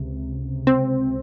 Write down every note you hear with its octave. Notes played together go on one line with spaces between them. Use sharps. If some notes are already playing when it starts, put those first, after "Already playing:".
Already playing: C#2 C3
C4